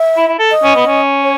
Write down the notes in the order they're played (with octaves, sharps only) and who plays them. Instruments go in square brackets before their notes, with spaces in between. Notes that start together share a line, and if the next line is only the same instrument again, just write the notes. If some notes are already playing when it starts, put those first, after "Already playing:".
Already playing: [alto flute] E5
[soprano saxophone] E4
E4
A4
[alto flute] D#5
[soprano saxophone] C#4
B3
C#4
[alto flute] C#5